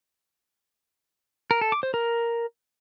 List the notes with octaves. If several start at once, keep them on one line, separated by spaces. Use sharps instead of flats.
A#4
A4
D6
C5
A#4